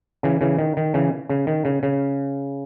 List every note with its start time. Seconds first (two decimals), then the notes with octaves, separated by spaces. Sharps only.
0.23 C#3 E3
0.41 C#3 E3
0.59 D#3
0.77 D#3
0.94 C#3 E3
1.29 C#3
1.47 D#3
1.65 C#3
1.83 C#3